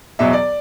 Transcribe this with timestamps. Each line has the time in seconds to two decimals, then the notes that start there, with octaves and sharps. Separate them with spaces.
0.19 E2 B2 F#3 E5
0.33 D5